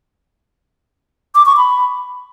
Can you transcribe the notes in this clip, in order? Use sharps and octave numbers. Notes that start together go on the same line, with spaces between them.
D6
C#6
B5